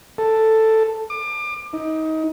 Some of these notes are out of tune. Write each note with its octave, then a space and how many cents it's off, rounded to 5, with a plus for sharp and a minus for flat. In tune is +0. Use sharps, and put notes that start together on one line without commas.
A4 +5
D6 +30
D#4 +25